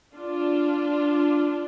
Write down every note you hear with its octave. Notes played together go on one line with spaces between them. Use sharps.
D4 F4